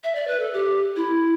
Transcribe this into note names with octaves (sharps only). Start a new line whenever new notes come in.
E5
D5
B4
A4
G4
E4